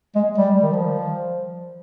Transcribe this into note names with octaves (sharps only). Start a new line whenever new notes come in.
G#3
G3
D#3
F3